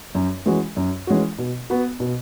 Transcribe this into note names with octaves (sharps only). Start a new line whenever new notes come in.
F#2
E3 G#3 C#4 F#4
F#2
E3 G#3 C#4 F#4
B2
B3 F#4
B2